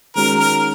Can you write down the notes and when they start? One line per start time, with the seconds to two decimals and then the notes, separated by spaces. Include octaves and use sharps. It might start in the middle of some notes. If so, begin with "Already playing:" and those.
0.15 D#3 G#3 C#4 F#4 A#4
0.38 A#4